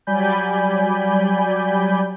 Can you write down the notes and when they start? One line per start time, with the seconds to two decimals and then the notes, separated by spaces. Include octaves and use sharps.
0.07 F#3 G3 D5 G#5 B5 G6